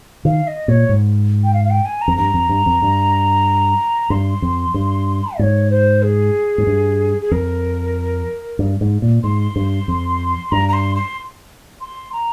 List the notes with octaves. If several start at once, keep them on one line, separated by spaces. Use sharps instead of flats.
D#3 F5
D#5
A#2 C#5
G#2
G5
F5
F5
G5
G#5
A#5
F2
G2 A#5
F2
G2
F2
G2
G2 C6
F2
G2
G#2 C#5
C5
G#4
G#2
G2
G#4
F2 A#4
G2
G#2
A#2
G#2 C6
G2
F2
G2 A#5
A#5
C6
C6
C6
A#5